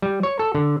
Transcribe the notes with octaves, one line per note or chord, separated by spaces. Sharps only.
G3
C#5
A4
D3